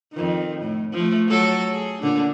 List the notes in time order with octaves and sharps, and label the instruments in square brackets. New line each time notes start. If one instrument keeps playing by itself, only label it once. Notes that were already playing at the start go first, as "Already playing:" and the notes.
[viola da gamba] F2 D#3
A2
F3 A3
F#3 A4
G#4
A#2 D3 D4